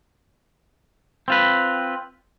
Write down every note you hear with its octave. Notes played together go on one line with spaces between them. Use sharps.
C4 F4 B4